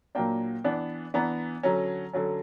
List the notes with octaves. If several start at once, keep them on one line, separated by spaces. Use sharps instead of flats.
A#2 F#3 A#3 D4 G5
E3 B3 D4
E3 B3 D4 A#5
D3 F#3 C#4 A#5
D3 F#3 C#4